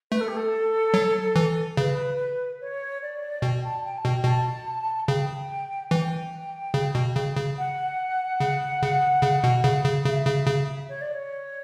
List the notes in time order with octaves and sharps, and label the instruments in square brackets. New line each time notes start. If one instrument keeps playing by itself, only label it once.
[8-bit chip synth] A3 [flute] B4
[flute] A4
G4
A4
[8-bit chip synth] F#3
E3
[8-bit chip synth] C#3 [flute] B4
[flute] C#5
D5
[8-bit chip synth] B2 [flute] G5
[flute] A5
G5
A5
[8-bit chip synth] B2 [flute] G5
[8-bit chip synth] B2 [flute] A5
[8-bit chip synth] C#3 [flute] G5
[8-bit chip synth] E3 [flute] G5
[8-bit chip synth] C#3
B2
C#3
C#3
[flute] F#5
[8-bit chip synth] C#3
C#3
C#3
B2
C#3
C#3
[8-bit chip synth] C#3 [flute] E5
[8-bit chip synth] C#3
C#3
[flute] C#5
D5
C#5